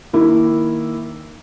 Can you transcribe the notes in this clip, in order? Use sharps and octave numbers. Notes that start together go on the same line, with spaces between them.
D#3 A#3 E4